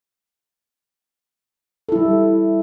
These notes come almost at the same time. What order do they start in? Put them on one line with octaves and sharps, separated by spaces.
A4 E4 G3